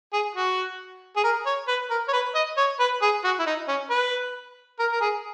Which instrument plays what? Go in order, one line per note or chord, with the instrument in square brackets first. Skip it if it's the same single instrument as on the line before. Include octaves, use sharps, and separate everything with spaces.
[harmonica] G#4
F#4
G#4
A#4
C#5
B4
A#4
C#5
B4
D#5
C#5
B4
G#4
F#4
E4
D#4
C#4
B4
A#4
A#4
G#4